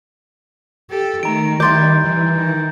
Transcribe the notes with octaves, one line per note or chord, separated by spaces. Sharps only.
G4 A4
D#3 A3 A#5 D7
D#3 G3 E4 C6 D6 G6 A6
E3
D#3